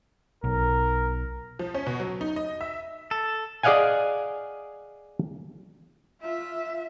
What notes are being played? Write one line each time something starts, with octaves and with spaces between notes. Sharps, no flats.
B1 A#4
F3
C#4
B2
F#3
D#4
D#5
E5
A4
G#4 D5 D#5 F5 F#5 G#5
F4 E5